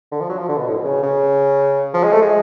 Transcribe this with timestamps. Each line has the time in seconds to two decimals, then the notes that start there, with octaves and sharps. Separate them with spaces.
0.12 D3
0.20 F3
0.30 F#3
0.39 F3
0.49 D3
0.57 B2
0.67 A2
0.76 B2
0.85 C#3
1.03 C#3
1.94 F3
2.04 G#3
2.12 A3
2.22 G#3